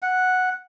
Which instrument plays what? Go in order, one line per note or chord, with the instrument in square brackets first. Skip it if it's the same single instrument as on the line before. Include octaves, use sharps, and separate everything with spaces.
[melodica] F#5